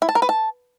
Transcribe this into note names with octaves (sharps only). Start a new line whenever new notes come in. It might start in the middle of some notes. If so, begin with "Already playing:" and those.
E4
A5
A#4
B4
A5